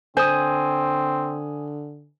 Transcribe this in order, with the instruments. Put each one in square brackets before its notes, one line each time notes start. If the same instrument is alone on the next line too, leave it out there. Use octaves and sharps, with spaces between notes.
[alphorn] D3 [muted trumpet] C4 [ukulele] C5 [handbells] G#5 D#6